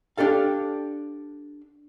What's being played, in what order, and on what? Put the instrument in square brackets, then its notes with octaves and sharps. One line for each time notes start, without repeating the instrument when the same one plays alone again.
[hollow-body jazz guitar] D4 G4 A4 F5